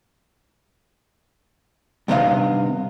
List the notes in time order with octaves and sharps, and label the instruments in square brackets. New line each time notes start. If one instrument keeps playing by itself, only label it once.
[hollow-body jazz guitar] G2 C3 D#3 B3 D#5 F5